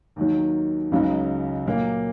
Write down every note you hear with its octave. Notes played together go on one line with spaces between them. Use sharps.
D#2 D#3 F#3
C#2 C#3 F#3 D#4
A#2 F#3 A#3